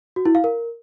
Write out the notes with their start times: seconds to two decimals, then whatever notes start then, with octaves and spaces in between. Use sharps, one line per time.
0.16 F#4
0.25 E4
0.35 F5
0.44 A#4